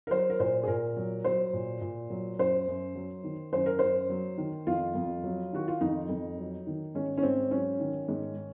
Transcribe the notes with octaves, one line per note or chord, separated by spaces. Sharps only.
A#4
F#3 C5
A#4
A#2 C5
G#4
A#2 A#4
F#3
F#3 C5
A#2
A#2
F#3
F#2 C5
F#2
F#3
D#3
F#2 C5
A#4
F#2 C5
F#3
D#3
F2 F4
F2
F#3
D#3 F#4
F4
F2 D#4
F2
F#3
D#3
G#2 C#4
C#4
G#2 C4
F#3 C#4
D#3
G#2